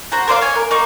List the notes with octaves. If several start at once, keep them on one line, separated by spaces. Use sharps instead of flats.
F#4 C5 A#5
A#4 C5 D5 F5
C#5 G#5
A#4
A#3 D#4 C#6